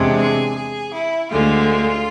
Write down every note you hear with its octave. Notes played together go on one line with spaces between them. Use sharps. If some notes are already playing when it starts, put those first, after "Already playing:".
Already playing: E2 C3 G#3 D4
G#4
G#4
E4
D2 D3 G#3 F4